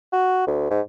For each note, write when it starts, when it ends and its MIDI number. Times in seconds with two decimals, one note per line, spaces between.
0.13 0.42 66
0.47 0.69 38
0.71 0.81 44